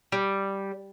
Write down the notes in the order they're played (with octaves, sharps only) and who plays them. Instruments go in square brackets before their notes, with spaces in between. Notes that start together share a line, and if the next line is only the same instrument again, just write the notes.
[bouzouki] G3